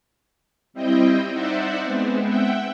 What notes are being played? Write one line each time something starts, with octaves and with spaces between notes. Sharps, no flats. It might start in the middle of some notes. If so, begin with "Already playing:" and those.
G3 C4 E4 D#5 G5
D#4 C5 D5 E5 F#5
G#3 B3 C4
E5 F#5 G5